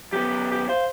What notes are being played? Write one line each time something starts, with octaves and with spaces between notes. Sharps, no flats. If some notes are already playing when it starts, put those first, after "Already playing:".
F#2 B3 G4
G4
C5 F5